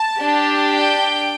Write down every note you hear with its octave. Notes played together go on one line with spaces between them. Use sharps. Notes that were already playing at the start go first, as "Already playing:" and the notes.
Already playing: A5
D4 G4
G5